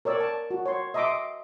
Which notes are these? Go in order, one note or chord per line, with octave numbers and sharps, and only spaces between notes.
A#4 C#5 D5 E6
A5
F#4
C#5 C6
D#5 E5 A#5 C6 D6